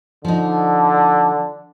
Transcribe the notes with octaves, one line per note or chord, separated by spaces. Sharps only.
D3 F3 D#4